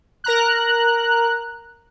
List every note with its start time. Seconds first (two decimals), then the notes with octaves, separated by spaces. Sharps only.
0.24 A#4 A#5 F#6